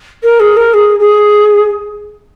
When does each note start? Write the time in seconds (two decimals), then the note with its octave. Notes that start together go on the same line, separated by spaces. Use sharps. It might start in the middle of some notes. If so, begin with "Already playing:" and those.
0.22 A#4
0.39 G#4
0.56 A#4
0.73 G#4
0.99 G#4